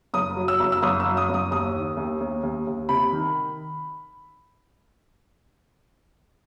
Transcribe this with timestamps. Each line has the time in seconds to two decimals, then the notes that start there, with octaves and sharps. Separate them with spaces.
0.14 F#1 D#6
0.36 F#3
0.48 E6
0.60 F#1
0.72 E6
0.82 F#1 D#6
1.00 E6
1.06 F#2
1.17 D#6
1.29 F#1 D#6
1.51 D#2 D#6
1.75 D#3
1.97 D#2
2.20 D#2
2.43 D#2
2.67 D#2
2.89 C3 B5
3.12 D#3